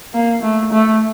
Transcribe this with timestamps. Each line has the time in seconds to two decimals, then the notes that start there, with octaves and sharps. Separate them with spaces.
0.14 A#3
0.42 A3
0.71 A3